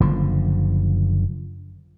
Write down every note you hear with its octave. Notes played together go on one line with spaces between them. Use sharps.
F#1 D3 F3